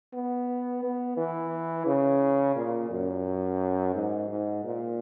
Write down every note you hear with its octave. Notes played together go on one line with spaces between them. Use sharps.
B3
B3
E3
C#3
A#2
F#2
G#2
G#2
A#2